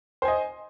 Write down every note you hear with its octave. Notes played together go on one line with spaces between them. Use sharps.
C5 D#5 G#5